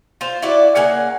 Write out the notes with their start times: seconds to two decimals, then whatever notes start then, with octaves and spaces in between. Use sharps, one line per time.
0.21 F4 C5
0.42 E4 F#4 D5
0.75 C#3 A#3 F#5 G#5